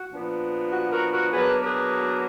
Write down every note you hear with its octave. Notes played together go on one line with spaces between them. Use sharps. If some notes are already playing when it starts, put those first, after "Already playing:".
Already playing: F#4
A#2 F3 B3 D4
F#4
F#4 A#4
F#4 A#4
B2 F#3 A#3 D4 G#4 B4
G#4 B4